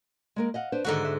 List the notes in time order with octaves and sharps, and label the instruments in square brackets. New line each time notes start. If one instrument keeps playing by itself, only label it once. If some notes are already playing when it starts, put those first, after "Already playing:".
[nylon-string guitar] G#3 A#3 A#4
D#5 F5 F#5
D4 B4 C5
[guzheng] G#2 D3 F#4 [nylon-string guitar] D#3 G#3 F#5
[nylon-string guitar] E5